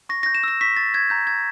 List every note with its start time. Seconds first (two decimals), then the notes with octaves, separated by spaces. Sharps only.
0.09 C#6 A#6
0.23 G6 A#6
0.35 E7
0.43 E6 A#6
0.61 C#6 B6
0.77 C#6 A6
0.94 G6 G#6
1.10 A#5 G6
1.27 E6 G#6